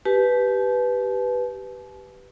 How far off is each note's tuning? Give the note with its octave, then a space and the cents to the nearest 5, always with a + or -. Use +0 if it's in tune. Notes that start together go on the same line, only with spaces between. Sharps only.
G4 -10 B4 +0 A5 -45